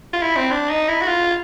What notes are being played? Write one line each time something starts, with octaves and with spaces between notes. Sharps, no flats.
F4
E4
C4
D4
D#4
E4
F#4
F4